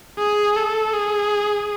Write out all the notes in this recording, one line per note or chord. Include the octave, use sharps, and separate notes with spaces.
G#4
A4
G#4